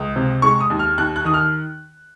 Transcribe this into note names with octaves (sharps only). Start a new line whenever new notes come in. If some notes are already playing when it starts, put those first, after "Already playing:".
Already playing: C#2 D#6
C3
G#3 C#6
D#6
D#2
F6
D#2 F#6
F#6
D#3 D#6
F6